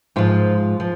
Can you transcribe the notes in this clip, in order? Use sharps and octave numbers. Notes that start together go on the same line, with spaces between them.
G#2 F3 F4
F3